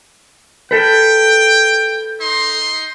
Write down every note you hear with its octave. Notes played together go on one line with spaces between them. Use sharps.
A4 B4 G5
D#4 C6